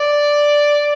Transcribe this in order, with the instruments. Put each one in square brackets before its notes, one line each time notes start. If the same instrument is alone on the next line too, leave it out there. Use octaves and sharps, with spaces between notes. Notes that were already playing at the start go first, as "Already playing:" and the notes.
Already playing: [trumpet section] D5